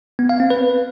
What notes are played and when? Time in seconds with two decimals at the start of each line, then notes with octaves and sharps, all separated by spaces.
0.19 B3
0.29 F5
0.40 C4
0.50 B4